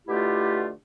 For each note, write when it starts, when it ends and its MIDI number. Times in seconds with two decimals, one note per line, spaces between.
0.08 0.70 47
0.08 0.70 50
0.08 0.70 57
0.08 0.70 64
0.08 0.70 65
0.08 0.70 67